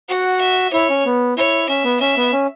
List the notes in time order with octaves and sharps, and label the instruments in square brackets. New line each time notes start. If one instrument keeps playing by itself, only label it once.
[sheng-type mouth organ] F#4 [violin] F#5
[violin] E5
[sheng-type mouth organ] E4 [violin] C#5
[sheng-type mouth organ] C#4
B3
[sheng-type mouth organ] E4 [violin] C#5
[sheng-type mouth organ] C#4 [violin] E5
[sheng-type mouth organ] B3
[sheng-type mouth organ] C#4 [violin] E5
[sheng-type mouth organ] B3
C#4